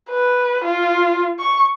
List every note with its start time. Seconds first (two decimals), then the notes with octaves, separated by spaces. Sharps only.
0.10 B4
0.64 F4
1.40 C#6